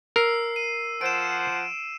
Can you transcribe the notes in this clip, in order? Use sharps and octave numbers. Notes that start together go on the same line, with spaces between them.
A#4 E6 C7
D#7
F3 C5 F#5 D7 E7